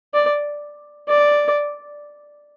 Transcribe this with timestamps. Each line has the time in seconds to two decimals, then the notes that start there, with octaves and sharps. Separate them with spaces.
0.14 D5
1.08 D5